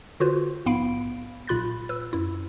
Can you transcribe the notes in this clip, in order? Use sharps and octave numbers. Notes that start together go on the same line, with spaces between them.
D3 F4 F#4 B4 C5
A#1 G#2 B3 F5 B5 D7
B1 A#2 F4 B5 F#6 A6
B4 E6
F#2 E4